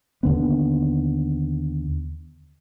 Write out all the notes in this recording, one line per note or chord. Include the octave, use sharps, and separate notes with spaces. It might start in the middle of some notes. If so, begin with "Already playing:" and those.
D#2 D3 B3